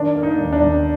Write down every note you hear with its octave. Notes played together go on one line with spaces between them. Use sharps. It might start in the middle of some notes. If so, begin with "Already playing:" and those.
Already playing: D#3 D4
A#3
D#4
D#2
D4
D#2